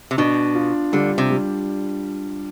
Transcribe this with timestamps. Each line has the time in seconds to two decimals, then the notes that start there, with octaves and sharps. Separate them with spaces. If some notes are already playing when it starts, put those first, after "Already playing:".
0.11 C3
0.18 B2 D4
0.55 F4
0.92 D3 G3
1.18 C3
1.30 G3